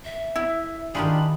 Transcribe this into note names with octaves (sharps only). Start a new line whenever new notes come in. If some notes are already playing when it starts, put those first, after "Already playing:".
E5
E4
D#3 D4 F4 G4 G#4 B5